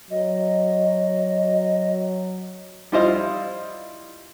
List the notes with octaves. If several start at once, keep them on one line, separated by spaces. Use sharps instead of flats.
F#3 D#5
G3 E4 F4 C5 D#5 F5